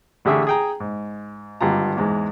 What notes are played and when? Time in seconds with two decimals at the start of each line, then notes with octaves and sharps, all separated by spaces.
0.25 A1 D3 G4 G#4 E5 C#6
0.47 G#4 G5 A#5
0.80 G#2
1.61 G#1 G2 D3 F4 A#5
1.97 E2 G#2 G#3